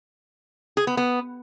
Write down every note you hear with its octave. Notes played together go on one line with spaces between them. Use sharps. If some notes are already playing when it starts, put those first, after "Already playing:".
G#4
B3
B3